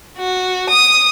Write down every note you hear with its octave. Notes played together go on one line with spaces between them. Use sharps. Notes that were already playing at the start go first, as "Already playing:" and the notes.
F#4
D#6